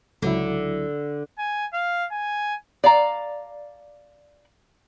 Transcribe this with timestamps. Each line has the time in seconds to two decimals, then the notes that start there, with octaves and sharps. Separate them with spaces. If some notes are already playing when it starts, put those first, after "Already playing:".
0.22 C#2 D3 F#3 E4
1.38 G#5
1.73 F5
2.12 G#5
2.84 D5 F5 A#5